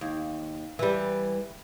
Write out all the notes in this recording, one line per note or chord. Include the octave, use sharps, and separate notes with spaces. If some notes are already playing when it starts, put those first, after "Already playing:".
D#2
E3 G3